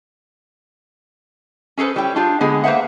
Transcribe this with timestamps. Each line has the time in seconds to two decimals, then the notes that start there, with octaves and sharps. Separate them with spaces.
1.77 C#4 G#4 A4 B4 C5
1.96 G3 E4 C#5 G5
2.16 D4 F4 G4 G#4
2.40 D3 G#3 B3 G#4
2.64 A#3 B4 C5 E5 F#5